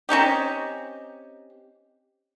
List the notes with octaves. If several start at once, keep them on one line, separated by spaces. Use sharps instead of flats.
C4 C#4 D#4 G4